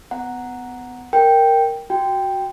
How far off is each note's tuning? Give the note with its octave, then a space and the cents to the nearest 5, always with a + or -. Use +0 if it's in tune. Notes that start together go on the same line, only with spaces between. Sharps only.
B3 +25 F#5 +0 A#5 +0
A#4 +0 G5 +0
F#4 +0 G5 +0